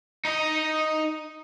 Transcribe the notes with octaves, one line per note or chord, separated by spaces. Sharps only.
D#4 D#5